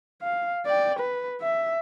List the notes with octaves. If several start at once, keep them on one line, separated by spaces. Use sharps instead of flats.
F5
D5 G5
B4
E5